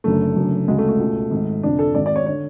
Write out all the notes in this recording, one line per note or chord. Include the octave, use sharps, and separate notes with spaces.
F#1 F#2 D3 A3
F#1 F#2 D3
D2 C#3 G#3
A3
A3
C#2 B2
G#1 G#2
F1 F2 D3 D4
A4
G#1 G#2 D5
D5
C#5
D3 C#5